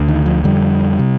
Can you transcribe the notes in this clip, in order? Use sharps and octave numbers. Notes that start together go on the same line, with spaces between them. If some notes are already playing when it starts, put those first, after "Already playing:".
Already playing: D2 D3
D#3
F3
F2 D3 G3
C3